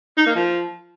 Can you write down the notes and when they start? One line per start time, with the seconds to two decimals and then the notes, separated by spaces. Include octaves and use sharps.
0.17 D#4
0.26 A#3
0.35 F3